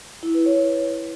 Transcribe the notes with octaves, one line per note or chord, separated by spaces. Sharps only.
E4
B4
C#5